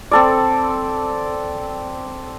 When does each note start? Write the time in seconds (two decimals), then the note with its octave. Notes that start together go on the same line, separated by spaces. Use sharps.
0.11 C4 A4 D5